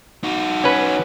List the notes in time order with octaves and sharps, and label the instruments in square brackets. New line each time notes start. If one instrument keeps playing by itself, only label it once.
[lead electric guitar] D#4 F#4
[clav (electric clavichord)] C#4 B4